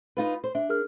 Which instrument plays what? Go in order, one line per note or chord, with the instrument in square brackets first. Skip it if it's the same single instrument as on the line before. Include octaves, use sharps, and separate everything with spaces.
[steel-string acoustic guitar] D#4 F4 B4
C5
[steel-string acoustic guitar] D4 [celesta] E5
[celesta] G#4 A#4 F6